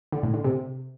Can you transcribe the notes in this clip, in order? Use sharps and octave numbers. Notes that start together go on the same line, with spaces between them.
D3
A2
D3
C3